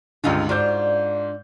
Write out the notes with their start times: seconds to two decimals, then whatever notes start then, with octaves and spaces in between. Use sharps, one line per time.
0.24 C#2 G2 D3 D#4 F4 G#4
0.49 G#2 D4 F4 F#4 C5 G6